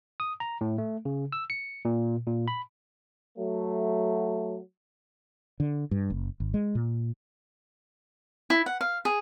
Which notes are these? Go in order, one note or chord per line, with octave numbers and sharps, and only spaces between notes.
D#6
A#5
A2
A3
C#3
E6
C#7
A#2
A#2
B5
F#3 A3
D3
G2
F#1
G#1
G#3
A#2
E4
F#5
F5
G#4